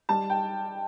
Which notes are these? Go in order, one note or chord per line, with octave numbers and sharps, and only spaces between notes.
G3 A5
G5